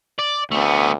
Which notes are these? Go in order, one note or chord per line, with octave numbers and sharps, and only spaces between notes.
D5
D2 A3 B3